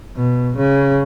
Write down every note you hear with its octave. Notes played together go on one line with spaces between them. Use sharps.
B2
C#3